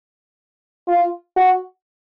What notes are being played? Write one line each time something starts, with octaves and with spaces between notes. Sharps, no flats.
F4
F#4